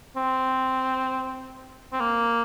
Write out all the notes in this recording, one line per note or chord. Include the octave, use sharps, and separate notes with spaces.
C4
C4
A#3